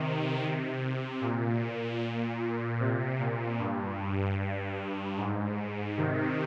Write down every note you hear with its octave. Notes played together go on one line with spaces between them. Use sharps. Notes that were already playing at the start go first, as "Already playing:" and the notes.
Already playing: C3 D#3
C3
A#2
C3
A#2
G2
G2
G#2
C3 D#3